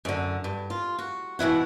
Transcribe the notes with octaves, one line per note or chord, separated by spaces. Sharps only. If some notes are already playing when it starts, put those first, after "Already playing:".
F#2 D3
G2
F4
F#4
B2 E3 E4 F#5